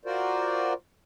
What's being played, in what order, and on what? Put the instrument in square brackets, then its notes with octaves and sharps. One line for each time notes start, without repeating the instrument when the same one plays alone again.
[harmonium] F4 F#4 A#4 C5 D5